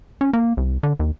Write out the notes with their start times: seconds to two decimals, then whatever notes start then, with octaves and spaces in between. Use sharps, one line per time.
0.21 C#4
0.33 A#3
0.57 C2
0.83 D3
1.00 D#2